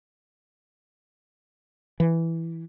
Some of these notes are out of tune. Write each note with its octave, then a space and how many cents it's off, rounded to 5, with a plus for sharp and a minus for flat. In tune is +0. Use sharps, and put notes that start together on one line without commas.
E3 +5